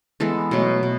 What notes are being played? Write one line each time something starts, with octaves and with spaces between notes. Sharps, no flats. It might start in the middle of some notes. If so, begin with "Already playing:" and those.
E3 G#3 B3 A4
B2 F#3 A3
B2